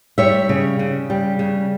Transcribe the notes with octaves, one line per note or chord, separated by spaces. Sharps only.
G3 C#5 E5
C#3
C#3
G3
C#3